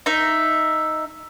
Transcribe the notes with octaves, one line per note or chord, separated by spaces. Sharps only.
D#4 E5